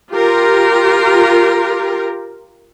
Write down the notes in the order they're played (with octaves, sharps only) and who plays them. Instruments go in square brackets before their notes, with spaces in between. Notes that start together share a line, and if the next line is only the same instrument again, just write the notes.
[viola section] F4 G4 A#4